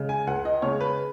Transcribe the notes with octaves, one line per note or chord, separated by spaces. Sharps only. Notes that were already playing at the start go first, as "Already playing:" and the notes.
Already playing: C#3 G#3
G#5
C#2 F#5
D#5
C#3 G#3 C#5
B4